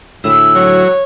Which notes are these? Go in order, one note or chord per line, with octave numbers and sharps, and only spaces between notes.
D2 A2 E4 G#4 E5
F#3 C#5